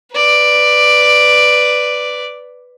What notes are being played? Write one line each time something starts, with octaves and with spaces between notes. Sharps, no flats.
B4 D5